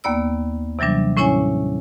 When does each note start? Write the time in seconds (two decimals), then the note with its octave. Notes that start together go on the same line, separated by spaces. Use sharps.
0.04 D#2 A#3 B3 D5 E6
0.79 C3 E3 F#3 G3 D4
1.17 A2 C#4 E4 C#5 G#5